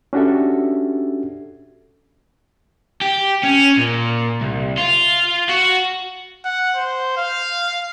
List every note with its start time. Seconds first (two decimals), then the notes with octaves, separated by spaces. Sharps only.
0.13 C#4 D4 F#4 G4 A4 E5
3.01 G4
3.43 C#4
3.78 A#2
4.41 C2
4.78 F4
5.49 F#4
6.45 F#5
6.76 C5
7.17 F5